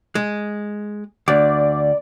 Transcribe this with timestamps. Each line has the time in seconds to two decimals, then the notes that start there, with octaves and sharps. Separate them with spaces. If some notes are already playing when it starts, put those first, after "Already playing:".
0.15 G#3
1.28 D2 D5